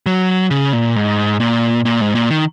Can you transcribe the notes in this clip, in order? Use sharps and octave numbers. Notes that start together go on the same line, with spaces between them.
F#3
C#3
A#2
G#2
A#2
A#2
G#2
A#2
D#3